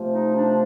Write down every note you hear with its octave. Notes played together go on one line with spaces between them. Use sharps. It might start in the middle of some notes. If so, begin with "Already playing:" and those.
Already playing: C3 F3 A3
D#4
D4